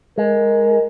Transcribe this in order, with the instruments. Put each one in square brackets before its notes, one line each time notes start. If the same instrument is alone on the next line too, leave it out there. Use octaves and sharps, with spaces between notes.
[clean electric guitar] G#3 [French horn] A#4